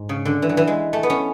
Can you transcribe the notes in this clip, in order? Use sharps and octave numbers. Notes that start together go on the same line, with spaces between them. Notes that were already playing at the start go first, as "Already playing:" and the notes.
Already playing: G#2
C#3
D3
E3
F#3
E3
G#3
A3
B3
C#4